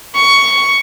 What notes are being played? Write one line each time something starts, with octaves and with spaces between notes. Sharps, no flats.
C#6